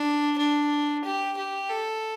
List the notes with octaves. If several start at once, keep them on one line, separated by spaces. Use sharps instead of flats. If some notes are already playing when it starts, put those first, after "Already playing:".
Already playing: D4
D4
G4
G4
A4